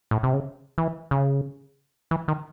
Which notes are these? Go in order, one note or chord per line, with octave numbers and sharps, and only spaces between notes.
A2
C3
C#3
E3
C#3
E3
D#3